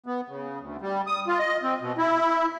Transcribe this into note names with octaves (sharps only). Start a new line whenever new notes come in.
B3
C#3
D2
G3
D#6
F4
D#5
C4
B2
E4